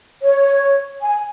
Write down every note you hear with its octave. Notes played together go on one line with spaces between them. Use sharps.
C#5
G#5